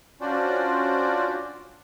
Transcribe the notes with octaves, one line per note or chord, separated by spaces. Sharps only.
C#4 D4 F4 F#4 C5 D5